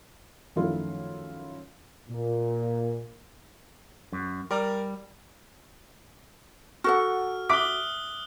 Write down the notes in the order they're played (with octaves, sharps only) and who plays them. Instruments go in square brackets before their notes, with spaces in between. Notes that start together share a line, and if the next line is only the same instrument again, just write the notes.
[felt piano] F#2 D#3 F3 A3 E4 F4
[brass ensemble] A#2
[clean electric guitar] F#2
[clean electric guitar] G3 [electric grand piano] A#4 D5 A#5
[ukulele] F#4 A4 F#5 [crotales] F6
[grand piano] E5 D6 B6 [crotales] D#6 F#6 G7